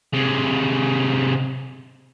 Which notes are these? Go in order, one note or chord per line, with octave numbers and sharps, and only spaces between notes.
C3 G#3